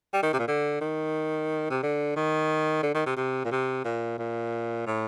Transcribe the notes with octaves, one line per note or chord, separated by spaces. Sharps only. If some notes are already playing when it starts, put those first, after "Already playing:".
G3
D#3
C3
A#2
D3
D#3
C3
D3
D#3
D3
D#3
C3
C3
A#2
C3
A#2
A#2
A2